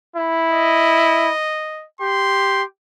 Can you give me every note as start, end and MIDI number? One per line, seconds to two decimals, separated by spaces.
0.16 1.31 64
0.52 1.86 75
2.01 2.63 67
2.01 2.64 84